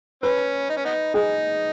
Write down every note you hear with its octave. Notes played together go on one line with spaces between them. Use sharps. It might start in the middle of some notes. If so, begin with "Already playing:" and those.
C#4 B4
D#4
C#4
B3 D#4
D#4 G#4